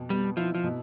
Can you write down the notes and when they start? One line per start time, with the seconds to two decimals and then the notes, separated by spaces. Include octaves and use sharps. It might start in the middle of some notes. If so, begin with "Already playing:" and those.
Already playing: F2 B2
0.10 G3 B3
0.37 F3 E4
0.55 F3
0.64 B2